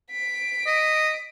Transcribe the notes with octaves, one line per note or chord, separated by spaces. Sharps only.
B6 D7
D#5